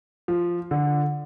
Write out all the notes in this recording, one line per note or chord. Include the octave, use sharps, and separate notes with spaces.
F3
D3